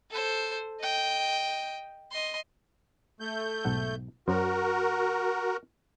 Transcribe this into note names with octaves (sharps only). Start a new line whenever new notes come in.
A4 C5
D#5 G5
D#5 C6
A3 G6
B1 G#2 F#5
F#2 F#3 F#4 A#4 C5